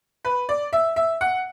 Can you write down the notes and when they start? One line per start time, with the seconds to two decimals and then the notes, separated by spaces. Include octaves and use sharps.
0.25 B4
0.49 D5
0.73 E5
0.96 E5
1.21 F#5